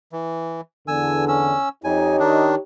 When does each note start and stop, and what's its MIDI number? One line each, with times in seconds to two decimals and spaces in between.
0.13 0.61 52
0.88 1.54 40
0.88 1.54 50
0.88 1.25 80
0.88 1.25 88
1.28 1.69 61
1.28 1.69 88
1.84 2.16 41
1.84 2.58 63
1.84 2.58 67
1.84 2.58 73
1.84 2.16 80
2.20 2.55 51
2.20 2.55 62